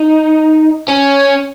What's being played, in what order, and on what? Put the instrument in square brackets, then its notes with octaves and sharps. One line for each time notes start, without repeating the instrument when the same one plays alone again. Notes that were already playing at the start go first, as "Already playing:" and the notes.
Already playing: [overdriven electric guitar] D#4
C#4